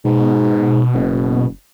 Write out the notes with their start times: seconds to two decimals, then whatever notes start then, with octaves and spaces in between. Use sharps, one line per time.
0.05 G#2 B2
0.94 F#1